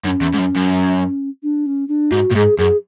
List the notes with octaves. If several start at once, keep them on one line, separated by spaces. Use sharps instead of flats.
F#2 D4
C#4
E2
G#2
F#2
F#2
D4
C#4
D4
G#2 F#4
A2
G#2 G#4
F#2 G#4